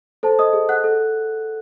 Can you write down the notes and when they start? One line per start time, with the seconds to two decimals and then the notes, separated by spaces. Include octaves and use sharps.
0.23 A4 C5 A5
0.39 D#5 D#6
0.53 G#4
0.69 F#5 F#6
0.84 A4